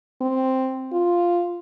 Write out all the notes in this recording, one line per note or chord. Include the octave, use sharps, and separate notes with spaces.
C4
F4